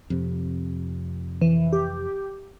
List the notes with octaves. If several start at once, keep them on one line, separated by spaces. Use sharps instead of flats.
F2 C3
E3
G4